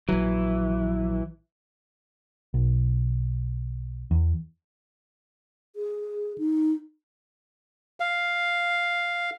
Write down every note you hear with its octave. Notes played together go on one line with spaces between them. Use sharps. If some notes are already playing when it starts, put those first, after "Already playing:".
A#1 E3 F#3
B1
E2
G#4
D#4
F5